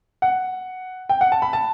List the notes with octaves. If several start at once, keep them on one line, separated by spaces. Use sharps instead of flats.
F#5
G5
F#5
A5
B5
A5